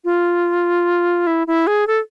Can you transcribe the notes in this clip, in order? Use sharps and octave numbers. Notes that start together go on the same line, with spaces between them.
F4
E4
E4
G#4
A4